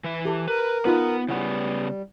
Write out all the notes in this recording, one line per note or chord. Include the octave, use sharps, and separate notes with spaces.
E3 E5
G4 A4
A#4 B4
B3 D#4 F4 B4
C#3 G3 B3 E4 F#5